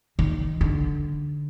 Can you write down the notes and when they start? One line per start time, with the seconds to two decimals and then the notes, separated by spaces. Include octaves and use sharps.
0.19 D#3
0.61 D3